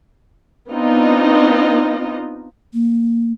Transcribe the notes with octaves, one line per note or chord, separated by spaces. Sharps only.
B3 C4 D4 D#4 F4 D#5
A#3